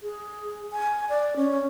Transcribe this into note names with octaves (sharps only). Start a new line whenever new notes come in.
G#4
G#5
D5
C#4